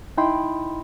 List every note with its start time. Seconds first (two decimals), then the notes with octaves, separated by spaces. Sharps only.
0.17 D#4 E4 D#5 G5 B5 C6